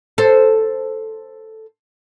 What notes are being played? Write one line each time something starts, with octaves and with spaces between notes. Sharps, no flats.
A4 C5